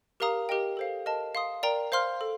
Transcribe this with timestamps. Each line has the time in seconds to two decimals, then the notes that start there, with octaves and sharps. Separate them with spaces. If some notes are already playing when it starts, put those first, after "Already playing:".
0.20 G4 A#4 F5 A#5 D#6
0.49 G4 A#4 D#5 G5
0.77 A4 C5 F5
1.06 A#4 D#5 A5
1.35 F5 C6 D#6
1.63 A#4 D5 G5 A#5
1.92 C5 F5 C6 F6
2.21 A4